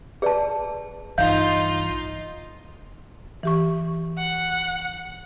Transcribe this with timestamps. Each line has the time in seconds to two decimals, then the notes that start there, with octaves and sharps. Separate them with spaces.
0.22 G#4 B4 D5 A5
1.18 A#1 G2 E3 D#4 F4 F5 G6
3.43 E3 G4 C#6
4.18 F#5